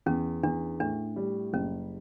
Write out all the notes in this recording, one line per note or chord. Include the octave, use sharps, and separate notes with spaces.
E2 C#4
E2 D4
A2 D4
G3
F#1 C#4